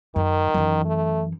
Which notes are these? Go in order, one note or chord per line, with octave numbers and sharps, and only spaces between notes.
F#2 D#3
F#2 E3
A3